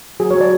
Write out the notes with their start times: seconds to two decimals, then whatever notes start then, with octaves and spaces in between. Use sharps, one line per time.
0.20 F#3 G#4
0.31 C#5
0.35 F#3
0.41 D5